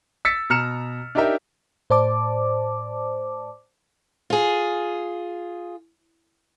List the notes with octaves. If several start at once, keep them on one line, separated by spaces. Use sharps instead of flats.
E6 A6 B6 C#7
B2 A#5 F6 C#7 E7
D4 D#4 G4 A#4 E5
A2 C5 D5 A5 D6
F4 G#4